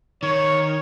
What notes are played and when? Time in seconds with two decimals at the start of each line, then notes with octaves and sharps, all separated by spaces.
0.23 D#3 C#5